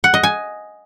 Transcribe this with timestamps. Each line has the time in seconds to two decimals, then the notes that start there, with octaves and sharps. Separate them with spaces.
0.04 F#5
0.14 D#5
0.23 G#5